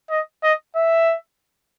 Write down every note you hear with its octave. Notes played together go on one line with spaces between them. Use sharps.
D#5
D#5
E5